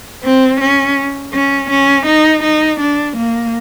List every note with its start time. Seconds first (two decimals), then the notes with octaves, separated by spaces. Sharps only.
0.24 C4
0.61 C#4
1.34 C#4
1.70 C#4
2.06 D#4
2.43 D#4
2.80 D4
3.17 A#3